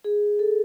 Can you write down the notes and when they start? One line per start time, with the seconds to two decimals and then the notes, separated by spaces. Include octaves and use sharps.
0.04 G#4
0.39 A4